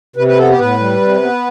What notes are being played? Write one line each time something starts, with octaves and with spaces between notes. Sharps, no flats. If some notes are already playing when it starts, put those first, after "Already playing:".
C3 B4
B4
B3 A4
G4
A2 B4
G3
C3
B3